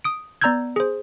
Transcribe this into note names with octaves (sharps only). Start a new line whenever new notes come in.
D#6 D7
B3 D5 A#5 E6 G6 G#6
G#4 C5